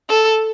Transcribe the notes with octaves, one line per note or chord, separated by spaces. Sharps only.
A4